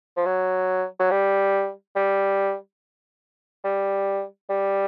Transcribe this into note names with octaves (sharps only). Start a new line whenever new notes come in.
F3
F#3
F#3
G3
G3
G3
G3